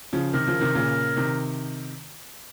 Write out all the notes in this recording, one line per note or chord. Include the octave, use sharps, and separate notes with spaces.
C#3 F3
C3 D#3 A#4
C#3 F3
C3 D#3
A#2 C#3
C3 D#3